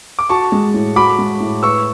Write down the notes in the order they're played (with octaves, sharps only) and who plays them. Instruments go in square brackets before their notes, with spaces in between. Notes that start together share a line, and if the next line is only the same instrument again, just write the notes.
[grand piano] D6
[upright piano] F#4 [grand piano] A5 C#6
[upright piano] G#3
A2
[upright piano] F#4 [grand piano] B5 D6
[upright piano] G#3
A2
[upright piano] B4 [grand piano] C#6 E6